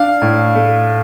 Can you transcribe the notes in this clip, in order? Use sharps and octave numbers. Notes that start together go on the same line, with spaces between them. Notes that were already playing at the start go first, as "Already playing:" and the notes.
Already playing: D4 F5
A2
A3